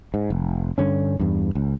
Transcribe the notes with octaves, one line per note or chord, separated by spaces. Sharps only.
G#2
F1
G2 D3 C#4
E2 G2
C#2